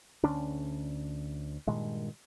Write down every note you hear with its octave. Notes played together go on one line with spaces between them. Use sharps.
D2 D3 C#4 D4
G2 A#2 D#3 G#3